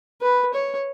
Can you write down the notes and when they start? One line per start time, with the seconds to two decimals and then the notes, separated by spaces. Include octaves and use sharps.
0.21 B4
0.54 C#5